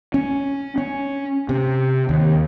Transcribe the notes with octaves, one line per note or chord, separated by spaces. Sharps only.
C#4
C#4
C3
D#2